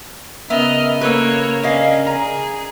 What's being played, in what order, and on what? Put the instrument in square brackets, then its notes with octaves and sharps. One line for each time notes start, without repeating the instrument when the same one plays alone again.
[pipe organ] C#3 A#4 [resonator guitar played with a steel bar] B3 E5 [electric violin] D#5 F6
[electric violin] A#3 C#5 [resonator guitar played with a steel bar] A4 B4
[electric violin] C#4 [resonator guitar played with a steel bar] D4 D#5 F5
[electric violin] G#4 [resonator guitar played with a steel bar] A#5